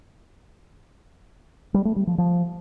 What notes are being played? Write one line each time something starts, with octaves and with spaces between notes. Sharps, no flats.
G3
A3
G3
F3
F3